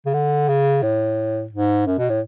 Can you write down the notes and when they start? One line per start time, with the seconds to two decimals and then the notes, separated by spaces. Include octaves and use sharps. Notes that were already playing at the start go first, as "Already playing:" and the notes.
0.06 C#3
0.14 D3
0.48 C#3
0.83 A2
1.52 G#2
1.86 F#2
1.98 B2
2.09 A2